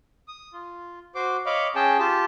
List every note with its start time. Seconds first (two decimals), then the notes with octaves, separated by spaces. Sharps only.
0.28 D#6
0.53 F4
1.15 F#4 C5 D6
1.46 C#5 D#5 F5 B5 D6
1.75 C#4 G#4 G5 A5
1.98 F4 G4 A5